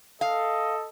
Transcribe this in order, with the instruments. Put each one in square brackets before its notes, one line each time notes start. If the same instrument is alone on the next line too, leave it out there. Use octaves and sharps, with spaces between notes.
[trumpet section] A4 D#5 [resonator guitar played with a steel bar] F5